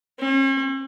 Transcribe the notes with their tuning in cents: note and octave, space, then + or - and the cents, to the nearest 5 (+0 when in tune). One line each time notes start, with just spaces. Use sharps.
C#4 -45